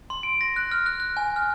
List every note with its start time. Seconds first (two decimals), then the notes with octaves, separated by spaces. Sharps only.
0.10 C6
0.23 D7
0.41 A#6
0.56 F#6
0.72 F6
0.86 F#6
1.00 F#6
1.17 G#5
1.36 F6